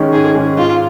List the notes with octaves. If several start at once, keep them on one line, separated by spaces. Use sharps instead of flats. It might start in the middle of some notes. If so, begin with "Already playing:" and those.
Already playing: D#3 G#3 C#4
G#2 G#4
D#3 G#3 C#4
G#2 F4